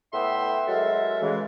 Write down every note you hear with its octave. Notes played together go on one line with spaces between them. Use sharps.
A2 B3 E5 G5 C6
F#3 G#3 A4 A#4 E5
C#3 E3 G#3